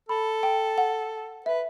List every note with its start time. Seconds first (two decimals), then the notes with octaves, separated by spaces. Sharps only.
0.09 A4 B5
0.43 G5
0.78 F#5
1.46 B4 E5